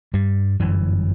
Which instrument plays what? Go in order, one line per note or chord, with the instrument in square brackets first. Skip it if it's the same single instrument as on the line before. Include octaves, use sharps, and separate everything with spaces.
[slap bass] G2 G3
G1 F#2 E3